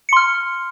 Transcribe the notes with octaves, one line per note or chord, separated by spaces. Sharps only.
C6 F6 C#7